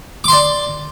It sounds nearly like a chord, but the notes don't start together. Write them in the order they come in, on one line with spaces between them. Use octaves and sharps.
D6 C6 D5